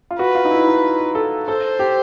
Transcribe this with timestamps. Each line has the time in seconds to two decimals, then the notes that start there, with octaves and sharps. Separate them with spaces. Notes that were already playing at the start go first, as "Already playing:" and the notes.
0.11 F4
0.19 F#4 B4
0.35 F4
0.45 D#4
0.51 E4
0.67 D#4
1.15 A4
1.47 A4 C5
1.79 G4